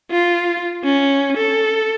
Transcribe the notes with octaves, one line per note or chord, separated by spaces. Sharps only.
F4
C#4
A4